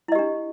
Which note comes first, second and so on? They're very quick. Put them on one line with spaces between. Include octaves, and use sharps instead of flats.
E4 D#5 G4 D4